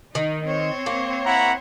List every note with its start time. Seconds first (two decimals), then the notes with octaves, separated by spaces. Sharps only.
0.15 D#3 D#4
0.44 C4 C5 C#5
0.86 A#3
1.26 E4 F#5 A#5